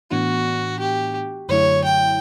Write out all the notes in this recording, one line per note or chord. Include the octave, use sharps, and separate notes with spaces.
A2 E3 B3 D4 F#4
G4
F#2 D3 F#3 A3 E4 C#5
G5